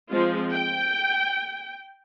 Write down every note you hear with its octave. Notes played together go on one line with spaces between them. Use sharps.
F3 G#3 C4 F4
G5